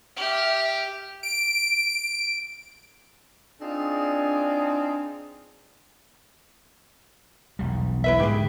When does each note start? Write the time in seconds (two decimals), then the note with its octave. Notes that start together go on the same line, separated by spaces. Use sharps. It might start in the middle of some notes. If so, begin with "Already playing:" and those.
0.16 G4 E5 F6
1.23 D7
3.61 C4 D4 D#4 F4 G#4
7.59 E1 B1 G3
8.04 E4 B4 E5
8.20 G#2 D3 G4 G#4